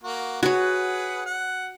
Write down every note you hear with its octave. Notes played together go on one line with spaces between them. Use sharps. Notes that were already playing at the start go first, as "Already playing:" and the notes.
A#3 F#4
F#4 G#4 B4 C#5 F#5
F#5